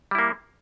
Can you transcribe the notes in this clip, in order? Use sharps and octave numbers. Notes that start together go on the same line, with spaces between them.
G3 A#3 E4